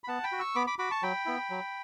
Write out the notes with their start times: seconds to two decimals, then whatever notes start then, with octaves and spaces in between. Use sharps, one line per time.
0.04 B5
0.08 B3 F#5 A5
0.23 G5 B5
0.32 F#4
0.39 C#6 E6
0.55 B3 B5 D6
0.67 B5 D6
0.79 F#4 B5 D6
0.91 A5 C#6
1.03 F#3 G5 B5
1.26 B3 E4
1.50 F#3